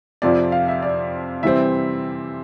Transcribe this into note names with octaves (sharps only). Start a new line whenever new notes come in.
F2 C3 F3 D5
F5
E5
D5
C3 E3 G3 C4 E5